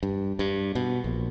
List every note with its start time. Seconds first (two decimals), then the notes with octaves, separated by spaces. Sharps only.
0.03 G2
0.39 G2
0.75 B2
1.04 A#1